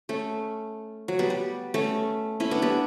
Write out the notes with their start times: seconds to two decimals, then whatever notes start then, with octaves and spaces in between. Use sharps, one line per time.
0.09 A3 C#4
1.08 F#3
1.19 G3 B3
1.30 G3
1.74 A3 C#4
2.40 C#4 E4
2.51 B3 D4
2.62 G3 B3